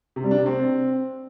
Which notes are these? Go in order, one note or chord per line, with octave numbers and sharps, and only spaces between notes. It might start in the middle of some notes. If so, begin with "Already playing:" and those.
C3
G3
D4
C3
C4